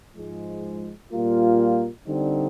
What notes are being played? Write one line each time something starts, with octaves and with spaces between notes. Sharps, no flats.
G#2 F3 G#3
A#2 G3 A#3 F4
D3 G3 C4 D#4